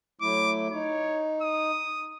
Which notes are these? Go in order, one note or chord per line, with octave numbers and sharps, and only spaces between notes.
F#3 A3 E4 D6
D#4 C#5
D#6